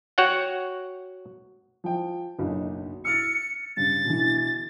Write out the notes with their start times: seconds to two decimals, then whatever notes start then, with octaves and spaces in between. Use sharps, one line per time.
0.18 F#4 C#5 F#5 G5
1.84 F3 G5
2.39 F#1 B1 D3
3.05 E6 F6 A6 C#7
3.77 G2 C#3 A6
4.05 B2 D3 E3